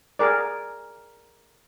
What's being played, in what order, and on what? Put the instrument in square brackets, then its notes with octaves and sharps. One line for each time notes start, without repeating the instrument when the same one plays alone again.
[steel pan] G#4 A#4 D5